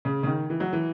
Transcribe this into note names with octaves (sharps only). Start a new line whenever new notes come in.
C#3
C#3
D#3
E3
F#3
E3